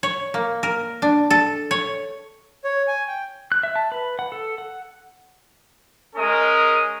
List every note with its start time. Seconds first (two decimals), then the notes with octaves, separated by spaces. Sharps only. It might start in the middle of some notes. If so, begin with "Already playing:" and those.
0.03 C#5
0.34 A#3
0.63 A#4
1.02 D4
1.30 A4
1.71 C#5
2.64 C#5
2.87 G#5
3.07 G5
3.52 F#6
3.63 E5
3.76 A5
3.92 B4
4.19 F#5
4.32 A4
4.58 F#5
6.16 G#3 C#4 A#4 D#6